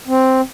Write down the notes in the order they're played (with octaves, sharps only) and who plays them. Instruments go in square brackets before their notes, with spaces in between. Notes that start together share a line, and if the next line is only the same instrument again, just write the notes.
[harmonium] C4